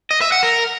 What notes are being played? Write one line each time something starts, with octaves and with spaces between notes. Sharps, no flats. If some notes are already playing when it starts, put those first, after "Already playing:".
D#5
E5
F#5
A#4